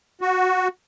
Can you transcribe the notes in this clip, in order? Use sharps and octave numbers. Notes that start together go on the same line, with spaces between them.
F#4